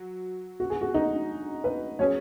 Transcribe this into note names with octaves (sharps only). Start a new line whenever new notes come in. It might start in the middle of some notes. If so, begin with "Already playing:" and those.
Already playing: F#3
F#4
G#4
F#4
D#4
B4
F#3 C#4 G#4 C#5